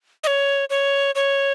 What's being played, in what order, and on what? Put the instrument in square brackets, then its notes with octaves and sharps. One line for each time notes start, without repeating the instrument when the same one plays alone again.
[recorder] D#5
C#5
C#5
C#5